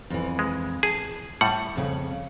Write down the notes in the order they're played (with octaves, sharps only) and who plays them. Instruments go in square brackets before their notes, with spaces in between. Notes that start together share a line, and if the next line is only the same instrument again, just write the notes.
[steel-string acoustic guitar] F2 E3
[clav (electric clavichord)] G#3
[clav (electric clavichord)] G#4 [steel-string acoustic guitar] A5
[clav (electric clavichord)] A2 G3 F#5
[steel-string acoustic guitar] F2 C#3